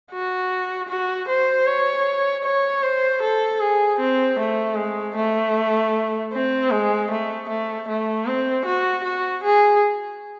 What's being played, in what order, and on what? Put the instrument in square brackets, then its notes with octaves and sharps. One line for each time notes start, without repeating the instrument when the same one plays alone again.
[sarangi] F#4
F#4
C5
C#5
C#5
C5
A4
G#4
C4
A3
G#3
A3
C4
G#3
A3
A3
A3
C4
F#4
F#4
G#4